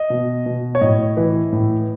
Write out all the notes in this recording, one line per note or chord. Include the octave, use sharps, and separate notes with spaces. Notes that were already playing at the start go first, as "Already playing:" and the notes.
Already playing: D#5
B2
B2
C#5
A2 D#5
E3
A2